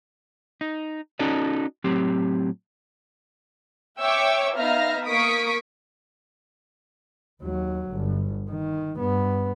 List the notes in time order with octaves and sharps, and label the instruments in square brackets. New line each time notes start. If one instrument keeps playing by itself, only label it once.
[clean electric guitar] D#4
C#4 D#4 F#4 A4 D5 D#5
A2 F#3 C4 G4
[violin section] C#5 E5 G5 C#6 D6 E6
B3 D#4 E5 F5 F6 A#6
A#3 C#6 D#6 B6 D7
[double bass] D#2 F#3
G1
D#3
G2 B3